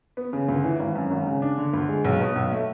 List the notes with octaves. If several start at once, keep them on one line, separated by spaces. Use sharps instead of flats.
B3
C#3
D2
E3
G#1
F#2
G#1
C#3
D4
D3
D2
G#3
B1
B2
B1
A3